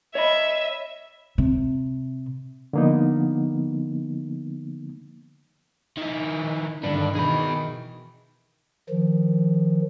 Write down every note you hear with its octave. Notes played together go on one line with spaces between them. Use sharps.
C#5 D#5 E5 B5
C3
D3 F3 A#3 B3 D#4
D#3 E4
G2 D3 D#3 D4 B4
B2 D#3 E3 G#4 B5
D#3 F3